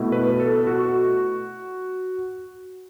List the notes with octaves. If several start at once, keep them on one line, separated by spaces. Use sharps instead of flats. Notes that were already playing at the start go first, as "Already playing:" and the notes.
Already playing: B2 A3 E4
B4
A4
F#4